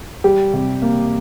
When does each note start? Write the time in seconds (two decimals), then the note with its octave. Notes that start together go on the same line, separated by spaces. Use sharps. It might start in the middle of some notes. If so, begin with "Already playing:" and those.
0.24 G3 G4
0.53 C3
0.82 A#3